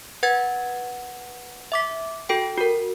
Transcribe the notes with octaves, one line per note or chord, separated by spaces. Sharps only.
B4 F#5 G#6 A6
E5 D6 B6
F#4 A4 G5
F#4 A#4